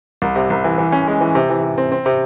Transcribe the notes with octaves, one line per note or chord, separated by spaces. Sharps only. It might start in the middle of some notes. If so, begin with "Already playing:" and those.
C2
C3
C2
E3
E3
C#4
G#3
E3
C3
E3
C3
C4
C4
C3